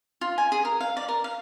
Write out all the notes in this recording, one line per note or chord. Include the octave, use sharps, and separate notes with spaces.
F4
G#5
G#4
A#4
F5
D5
A#4
F5